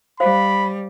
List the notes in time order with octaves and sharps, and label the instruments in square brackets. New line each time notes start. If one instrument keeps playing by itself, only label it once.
[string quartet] G3 [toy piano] C5 F5 [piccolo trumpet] B5